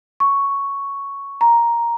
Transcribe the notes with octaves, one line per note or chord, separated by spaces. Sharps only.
C#6
A#5